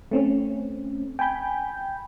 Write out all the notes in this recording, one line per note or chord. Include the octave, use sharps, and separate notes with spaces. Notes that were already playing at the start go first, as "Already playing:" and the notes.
A3 C4 C#4
G5 G#5 B5 G6